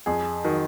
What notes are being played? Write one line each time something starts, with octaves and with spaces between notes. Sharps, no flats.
F2 G#4
D#3 F#3